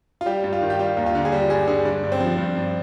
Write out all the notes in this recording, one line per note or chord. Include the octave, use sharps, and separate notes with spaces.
F4
G3 G4
G2
F4
D#3
G4
G3 F4
D#2
F4
D3
G#4
G3 G4
G2 G#4
D3 G#4
G2 D4
G2
C4
F3
G2
G2